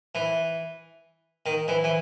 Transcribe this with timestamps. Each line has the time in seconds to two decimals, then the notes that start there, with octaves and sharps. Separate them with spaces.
0.15 E3
1.46 D#3
1.68 E3
1.84 E3